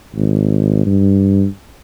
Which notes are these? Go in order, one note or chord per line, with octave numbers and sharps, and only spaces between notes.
G#1
G2